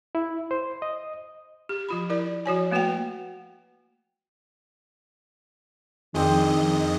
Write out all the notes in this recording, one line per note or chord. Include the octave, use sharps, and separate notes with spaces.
E4
C5
D#5
G4
F3 F4 B5
E4 A#4 D5
F3 F#4 C#5 G#5
A3 A#3 F#4 B4 F#5 G5
F2 D#3 G#3 C4 D4 D#5